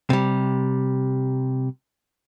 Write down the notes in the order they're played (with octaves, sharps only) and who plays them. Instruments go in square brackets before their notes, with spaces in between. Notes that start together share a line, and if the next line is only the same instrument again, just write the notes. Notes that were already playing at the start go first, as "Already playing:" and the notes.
[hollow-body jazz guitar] C3 G3